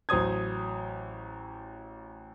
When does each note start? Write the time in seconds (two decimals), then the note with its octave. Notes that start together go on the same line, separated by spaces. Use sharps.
0.09 A1 F#3 C5 D#6 G#6